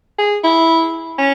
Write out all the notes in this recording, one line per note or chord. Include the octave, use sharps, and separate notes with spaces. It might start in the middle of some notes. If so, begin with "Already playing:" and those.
G#4
E4
C#4